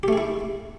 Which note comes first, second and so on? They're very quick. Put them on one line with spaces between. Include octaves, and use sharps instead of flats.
G4 A3 G#4 E4